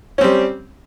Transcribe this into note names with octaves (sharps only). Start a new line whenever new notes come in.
G3 C4 C#4